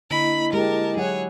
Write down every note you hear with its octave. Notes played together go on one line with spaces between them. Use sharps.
D3 A#3 E4 D#5 B5
G#3 G4 A#4 A5
F#3 E4 G#4 C#5 F#5